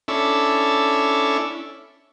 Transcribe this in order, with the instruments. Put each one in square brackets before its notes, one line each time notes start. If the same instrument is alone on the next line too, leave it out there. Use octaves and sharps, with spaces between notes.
[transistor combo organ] C#4 D4 E4 A4